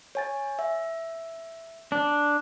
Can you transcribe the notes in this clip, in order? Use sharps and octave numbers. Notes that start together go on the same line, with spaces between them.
C#5 G#5 A6
E5
D4